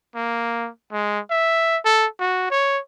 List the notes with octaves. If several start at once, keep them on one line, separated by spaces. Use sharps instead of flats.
A#3
G#3
E5
A4
F#4
C#5